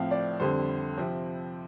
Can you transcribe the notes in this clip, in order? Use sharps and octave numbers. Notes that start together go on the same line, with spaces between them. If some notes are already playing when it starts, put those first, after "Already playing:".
Already playing: A2 F3 C4 F5
D5
F2 D3 G3 C5
C3 F3 C4